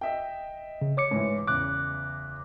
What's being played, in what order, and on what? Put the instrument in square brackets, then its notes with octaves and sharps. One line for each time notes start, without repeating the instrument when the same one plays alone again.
[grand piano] D#5 E5 G5
[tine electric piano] C#3
C#5 D6 C#7
[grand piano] G#2 E3
[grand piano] E2 C#3 [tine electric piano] D6 F#6